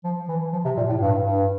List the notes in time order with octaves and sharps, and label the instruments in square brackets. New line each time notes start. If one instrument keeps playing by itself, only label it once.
[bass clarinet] F3
E3
F3
C3
A#2
A2
G2
G2